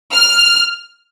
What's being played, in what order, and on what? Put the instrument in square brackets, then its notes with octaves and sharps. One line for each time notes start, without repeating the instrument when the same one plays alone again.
[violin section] F6